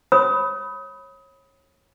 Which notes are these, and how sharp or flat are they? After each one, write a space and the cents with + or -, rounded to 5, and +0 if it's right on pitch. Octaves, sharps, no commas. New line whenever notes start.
C#5 -25 B5 +0 D#6 +30